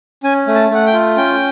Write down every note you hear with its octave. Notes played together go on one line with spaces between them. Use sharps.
C#4 G#5
A3
A5
A3 F#5
G5
F4
C#4 G5